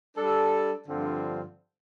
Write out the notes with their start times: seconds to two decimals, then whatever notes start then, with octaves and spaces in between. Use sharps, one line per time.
0.16 G3 D4 A4
0.86 G2 D3 F3 C4 F4